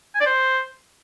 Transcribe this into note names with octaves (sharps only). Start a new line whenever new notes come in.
G#5
D5
C5